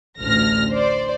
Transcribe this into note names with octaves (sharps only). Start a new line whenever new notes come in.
A1 D2 F6 A#6
C5 D5